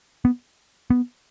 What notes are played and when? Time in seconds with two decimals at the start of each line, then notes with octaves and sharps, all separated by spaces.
0.25 B3
0.90 B3